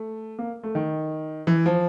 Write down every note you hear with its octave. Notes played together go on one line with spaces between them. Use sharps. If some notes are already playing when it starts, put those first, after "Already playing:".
Already playing: A3
A#3
A3
D#3
E3
F3